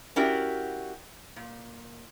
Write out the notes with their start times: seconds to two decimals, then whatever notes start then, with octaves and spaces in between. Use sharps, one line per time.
0.16 C#4 E4 F#4 G4 A#4 D5
1.36 A#2